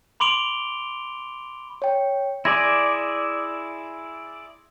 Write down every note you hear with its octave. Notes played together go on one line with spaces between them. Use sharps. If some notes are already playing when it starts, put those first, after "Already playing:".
B5 C6 D6 D7 F7 G7
C#5 G5
E4 G#4 D5 C6 G#6 A#6